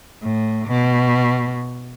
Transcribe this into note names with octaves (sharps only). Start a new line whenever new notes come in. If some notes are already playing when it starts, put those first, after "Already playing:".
A2
B2